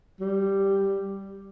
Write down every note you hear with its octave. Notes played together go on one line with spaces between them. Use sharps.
G3